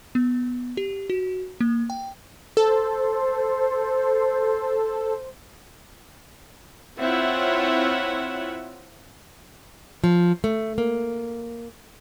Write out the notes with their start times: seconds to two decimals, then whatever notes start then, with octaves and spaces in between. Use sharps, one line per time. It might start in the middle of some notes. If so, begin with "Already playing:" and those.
0.15 B3
0.77 G4
1.10 F#4
1.61 A#3
1.90 G5
2.57 A4 C5
6.98 C4 E4 F4 C#5 E5 F#5
10.04 F3
10.44 A3
10.78 A#3